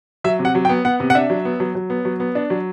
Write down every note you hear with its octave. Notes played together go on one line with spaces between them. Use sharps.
F#3 E5
C3
F#5
F#3
G5
B3
B3 F#5
C3
F#5
D4 E5
F#3
B3
F#3
F#3
B3
F#3
B3
D4
F#3